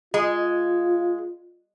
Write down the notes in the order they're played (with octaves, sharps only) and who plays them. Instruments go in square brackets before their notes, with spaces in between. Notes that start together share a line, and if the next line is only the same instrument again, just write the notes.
[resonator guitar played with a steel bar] G#3 [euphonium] F4